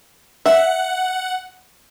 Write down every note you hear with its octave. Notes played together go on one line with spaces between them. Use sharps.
E5 F#5